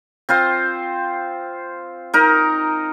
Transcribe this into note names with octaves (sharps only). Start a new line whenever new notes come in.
C4 F4 C5
D#4 A#4